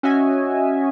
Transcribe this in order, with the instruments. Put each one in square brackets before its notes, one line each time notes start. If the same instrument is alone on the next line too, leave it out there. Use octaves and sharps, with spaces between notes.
[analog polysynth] C#4 F#4 D#5 E5 G#5